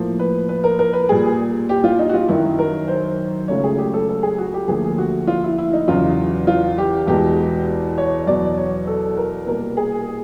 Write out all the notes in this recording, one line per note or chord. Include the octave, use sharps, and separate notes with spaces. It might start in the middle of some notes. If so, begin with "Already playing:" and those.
Already playing: A2 F3 A#3
B4
B4
A#4
A#4
B4
A#2 G3 A#3 G#4
G4
F4
D#4
F#4
F4
F#2 D#3 F#3 E4
A#4
C5
C#2 C#3 F#3 A3 C#5
G#4
G4
A4
A4
G#4
F#4
G4
D2 D3 F3 A#3 G#4
F#4
F4
E4
E4
D#4
E2 C#3 F#3 F4
F4
G4
E2 B2 G#3 G4
C#5
E2 B2 F#3 D5
C#5
A4
A#4
C2 B2 G3 A#3 A#4
G#4